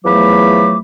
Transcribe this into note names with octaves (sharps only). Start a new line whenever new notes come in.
E2 F3 F#3 A3 B5 D6